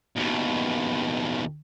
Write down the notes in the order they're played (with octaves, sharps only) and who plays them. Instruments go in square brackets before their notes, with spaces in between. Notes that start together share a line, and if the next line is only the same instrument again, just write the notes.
[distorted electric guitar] D#2 B2